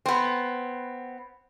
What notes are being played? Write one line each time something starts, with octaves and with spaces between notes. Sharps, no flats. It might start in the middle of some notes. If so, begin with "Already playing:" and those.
B3 C4